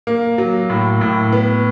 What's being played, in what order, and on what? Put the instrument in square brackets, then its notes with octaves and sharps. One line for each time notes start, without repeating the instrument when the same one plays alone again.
[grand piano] A#3
F#3
A2
A2
B3